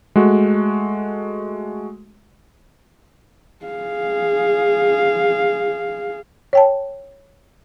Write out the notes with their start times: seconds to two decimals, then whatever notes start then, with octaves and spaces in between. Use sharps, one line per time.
0.16 G#3 A3 F#4
3.65 G#4 F5
6.53 C#5 G5 A5